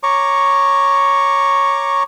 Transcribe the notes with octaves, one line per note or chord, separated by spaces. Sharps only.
C#5 A#5 C#6 D6